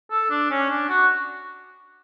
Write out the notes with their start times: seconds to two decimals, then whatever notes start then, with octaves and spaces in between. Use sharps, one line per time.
0.11 A4
0.30 D4
0.51 C#4
0.70 D4
0.89 F#4